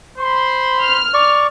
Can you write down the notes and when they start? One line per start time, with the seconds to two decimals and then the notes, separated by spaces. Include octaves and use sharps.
0.19 C5 B5 C6
0.82 F6
1.14 D5 C#6